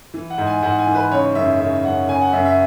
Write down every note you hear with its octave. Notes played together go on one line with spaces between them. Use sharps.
E3
F#5
G#2
G#5
G#2 F#5
G#5
E3
B4
C#3 C#5
F#2 E5
C#3 E5
F#2 F#5
C#3 G#5
F#5
F#2 E5
E5